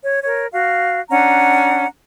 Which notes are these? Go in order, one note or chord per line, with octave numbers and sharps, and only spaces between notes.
C#5
A#4 C#5
F#4 F5
C#4 D4 F#5 A#5